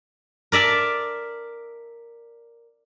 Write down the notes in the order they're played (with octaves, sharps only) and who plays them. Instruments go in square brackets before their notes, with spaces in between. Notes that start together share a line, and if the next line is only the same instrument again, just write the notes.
[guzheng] A#4 D5 E5 A5